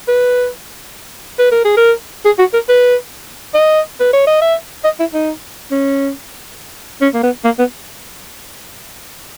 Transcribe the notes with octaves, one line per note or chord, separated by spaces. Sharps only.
B4
B4
A#4
G#4
A#4
G#4
F#4
A#4
B4
D#5
B4
C#5
D#5
E5
D#5
E4
D#4
C#4
C#4
A#3
B3
A#3
B3